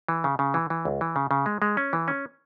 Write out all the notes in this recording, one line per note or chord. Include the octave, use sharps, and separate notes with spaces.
E3
C#3
C#3
E3
E3
C#2
E3
C#3
C#3
G#3
G#3
C#4
E3
C#4